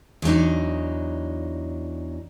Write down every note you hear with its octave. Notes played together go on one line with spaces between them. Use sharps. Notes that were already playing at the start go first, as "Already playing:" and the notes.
E2 F#3 D4 D#4